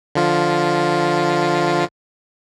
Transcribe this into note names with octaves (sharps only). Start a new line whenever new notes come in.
D3 F3 F4